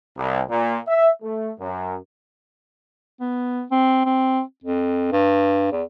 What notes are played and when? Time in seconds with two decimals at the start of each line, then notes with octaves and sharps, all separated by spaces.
0.17 C2
0.50 A#2
0.88 E5
1.23 A3
1.60 F#2
3.20 B3
3.71 C4
4.05 C4
4.64 F2
5.12 G2
5.72 E2